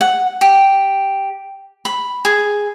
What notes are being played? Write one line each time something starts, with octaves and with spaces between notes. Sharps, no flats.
F#5
G4
B5
G#4